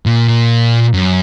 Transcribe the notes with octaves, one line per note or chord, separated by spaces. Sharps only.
A#2
F#2